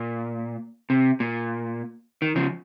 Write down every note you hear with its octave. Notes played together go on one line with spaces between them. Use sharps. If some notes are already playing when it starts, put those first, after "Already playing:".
Already playing: A#2
C3
A#2
D#3
C#3 F3